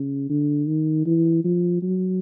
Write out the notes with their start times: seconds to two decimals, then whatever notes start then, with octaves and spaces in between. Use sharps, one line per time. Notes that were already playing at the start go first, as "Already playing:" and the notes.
Already playing: C#3
0.29 D3
0.67 D#3
1.06 E3
1.44 F3
1.82 F#3